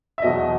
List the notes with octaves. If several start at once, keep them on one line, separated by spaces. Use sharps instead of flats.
E5
E1 E2 B2 F#3 D#5